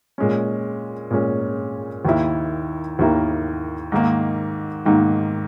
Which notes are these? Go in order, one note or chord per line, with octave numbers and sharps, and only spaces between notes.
A#2 G#3 C#4
A#2 G#3 C#4
D#2 D#3 A#3 E4 A#4
D#2 D#3 A#3 E4 A#4
G#2 D#3 A#3
G#2 D#3 A#3